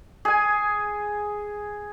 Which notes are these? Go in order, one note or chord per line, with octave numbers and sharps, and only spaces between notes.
G#4 G#5